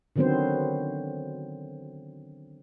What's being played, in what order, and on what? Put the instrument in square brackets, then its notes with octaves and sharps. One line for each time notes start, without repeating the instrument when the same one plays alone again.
[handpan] D3 D#3 F#3 B3 C4 C5